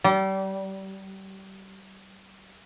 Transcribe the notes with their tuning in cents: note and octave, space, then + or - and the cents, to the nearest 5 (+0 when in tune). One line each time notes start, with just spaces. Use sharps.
G3 -30